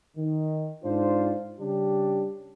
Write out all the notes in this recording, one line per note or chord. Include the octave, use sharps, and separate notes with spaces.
D#3
G#2 D4 F4 C5
C#3 G3 C#4 D4 G4